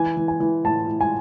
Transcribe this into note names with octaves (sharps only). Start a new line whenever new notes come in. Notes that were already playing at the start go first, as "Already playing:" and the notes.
Already playing: E3 G#5
E3
G#5
E3
A2 A5
A2
G#5